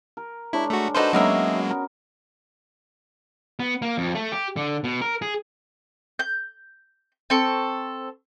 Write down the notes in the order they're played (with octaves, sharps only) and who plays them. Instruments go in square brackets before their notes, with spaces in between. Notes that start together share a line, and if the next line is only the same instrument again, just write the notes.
[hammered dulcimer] A#4
[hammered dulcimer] G#3 D4 C#5 [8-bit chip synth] E4
[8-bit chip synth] A3 F#4
[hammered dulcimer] D4 F#4 [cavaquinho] D#4 D5 C6 [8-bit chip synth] A4 B4 C5
[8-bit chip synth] F#3 G#3 A#3 [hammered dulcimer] B3 C#4 [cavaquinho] D#4 A#4 E5
[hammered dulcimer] A#4
[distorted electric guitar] B3
A#3
F2
A3
G4
D3
B2
A#4
G#4
[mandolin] G6
C4 A4 C#6